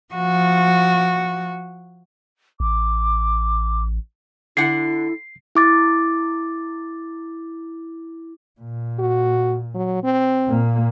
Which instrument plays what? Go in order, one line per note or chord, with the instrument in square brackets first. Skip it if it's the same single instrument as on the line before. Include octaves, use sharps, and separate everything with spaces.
[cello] F3 F#4
[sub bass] A1 [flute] D6
[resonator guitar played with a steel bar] D3 F#5 [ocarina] E4 [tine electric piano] C7
[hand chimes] E4 D6 A6
[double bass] A#2
[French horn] F#4
F#3
C4
[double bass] A#2 A#3